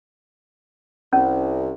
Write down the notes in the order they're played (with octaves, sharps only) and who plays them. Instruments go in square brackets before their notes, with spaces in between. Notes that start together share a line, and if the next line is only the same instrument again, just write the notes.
[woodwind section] C2 [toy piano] C#4